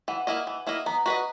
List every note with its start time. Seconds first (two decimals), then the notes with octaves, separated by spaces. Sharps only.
0.08 E3 F#5
0.27 A#3 E4 A#4 D#5
0.47 E3
0.67 A#3 E4 A#4 D#5
0.86 B3 A#5
1.06 F#4 B4 D#5